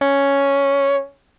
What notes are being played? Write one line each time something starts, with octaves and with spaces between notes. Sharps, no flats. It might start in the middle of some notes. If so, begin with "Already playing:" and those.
C#4